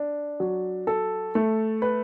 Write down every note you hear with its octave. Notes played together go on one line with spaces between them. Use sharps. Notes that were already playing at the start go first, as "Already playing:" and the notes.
Already playing: D4
F#3
A4
A3
B4